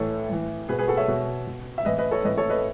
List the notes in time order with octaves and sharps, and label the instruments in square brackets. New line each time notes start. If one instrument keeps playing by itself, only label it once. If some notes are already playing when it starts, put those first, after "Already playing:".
Already playing: [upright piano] A2 E3 A4 C#5
A2 E3
B2 G#4 B4
G#4 B4
F#4 A4
C#5 E5
B2
B2
E5
A2 E3 B4 D#5
B4 D#5
A4 C#5
A2 E3 B4 D#5
A4 C#5
B4 D#5